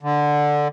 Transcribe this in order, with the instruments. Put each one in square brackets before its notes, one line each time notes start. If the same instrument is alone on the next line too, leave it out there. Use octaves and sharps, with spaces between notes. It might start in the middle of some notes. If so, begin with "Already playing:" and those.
[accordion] D3